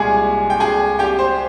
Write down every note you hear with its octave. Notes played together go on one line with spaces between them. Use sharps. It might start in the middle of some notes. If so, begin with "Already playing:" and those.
Already playing: C2 A#2 G#3 G#4 G#5
G5
G#4 G#5
G4 G5
C5